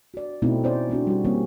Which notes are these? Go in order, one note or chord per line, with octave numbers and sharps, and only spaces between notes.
F#4 D5
B2 A3 C4 D#4 E4
C#4 C5 D5
A3 C4 D4 F#4
G3 F#4
E3 G3 A#3 C4 C#4